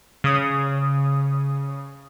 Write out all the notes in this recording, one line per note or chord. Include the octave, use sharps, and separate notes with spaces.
C#3 D#6